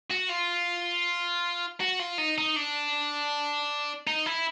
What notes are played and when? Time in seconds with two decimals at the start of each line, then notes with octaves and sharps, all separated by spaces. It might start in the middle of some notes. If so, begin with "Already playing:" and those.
0.11 F#4
0.30 F4
1.81 F#4
2.00 F4
2.18 D#4
2.38 D#4
2.56 D4
4.07 D#4
4.26 E4